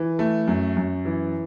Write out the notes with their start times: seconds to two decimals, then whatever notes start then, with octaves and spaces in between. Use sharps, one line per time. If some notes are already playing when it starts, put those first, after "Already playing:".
Already playing: E3
0.19 A3
0.48 F#2
0.77 F#2
1.05 E3